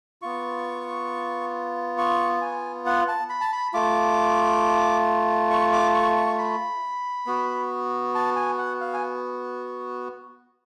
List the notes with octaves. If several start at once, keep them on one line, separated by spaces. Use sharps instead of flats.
B3 F4 C#6
C#6
G#5
F#5
A5
B5
A5
B5
A3 F4 D6
C#6
D6
C#6
C#6
B5
B3 F#4
A5
G#5
F#5
F5
G#5